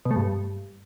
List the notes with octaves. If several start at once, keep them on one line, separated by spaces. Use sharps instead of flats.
B2
A3
G2